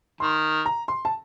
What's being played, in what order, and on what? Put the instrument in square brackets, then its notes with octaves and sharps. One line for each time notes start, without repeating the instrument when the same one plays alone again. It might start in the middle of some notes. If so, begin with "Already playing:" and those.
[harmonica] D#3 [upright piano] C6
[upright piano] A#5
C6
A5